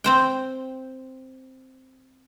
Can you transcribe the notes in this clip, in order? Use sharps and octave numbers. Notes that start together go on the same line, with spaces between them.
C4 C5 G5